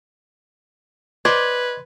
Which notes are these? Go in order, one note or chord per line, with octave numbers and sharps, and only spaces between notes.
B4 C5 D5 D#5 G#6